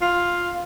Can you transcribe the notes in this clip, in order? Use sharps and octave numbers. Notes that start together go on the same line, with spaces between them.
F4